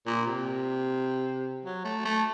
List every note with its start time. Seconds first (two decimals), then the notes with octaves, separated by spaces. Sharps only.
0.07 A#2
0.27 C3
1.65 F#3
1.85 A3
2.05 A3